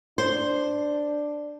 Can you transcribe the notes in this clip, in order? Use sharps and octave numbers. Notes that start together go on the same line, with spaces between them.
D4 C5